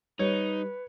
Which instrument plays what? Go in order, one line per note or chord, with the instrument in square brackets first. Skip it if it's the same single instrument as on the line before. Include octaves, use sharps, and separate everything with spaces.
[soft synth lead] G3 [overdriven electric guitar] D#4 [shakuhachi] B4 [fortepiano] C#5